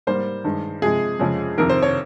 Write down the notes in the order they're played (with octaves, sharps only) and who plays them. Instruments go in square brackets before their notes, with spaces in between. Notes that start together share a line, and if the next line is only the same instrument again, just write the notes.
[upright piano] G#2 G3 A#3 C5
G2 D#3 G#3
C3 F3 G#3 G#4
F2 C#3 F3 G#3
F2 C3 D#3 A#4
C5
C#5